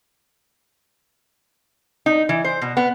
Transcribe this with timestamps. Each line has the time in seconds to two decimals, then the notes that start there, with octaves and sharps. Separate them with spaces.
2.06 D#4
2.29 E3
2.44 C5
2.62 B2
2.77 B3